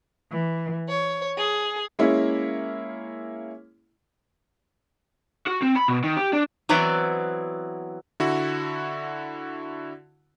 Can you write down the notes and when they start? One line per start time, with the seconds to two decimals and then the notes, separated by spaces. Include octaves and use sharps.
0.30 E3
0.88 C#5
1.37 G#4
1.99 G#3 A#3 C#4 E4
5.47 F#4
5.62 C4
5.75 B5
5.88 B2
6.04 D#3
6.17 G4
6.33 D4
6.69 E3 F#3 B3 C4 E4 D5
8.20 D3 E4 F#4